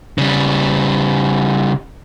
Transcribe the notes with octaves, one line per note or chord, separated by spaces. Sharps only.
C#3 G3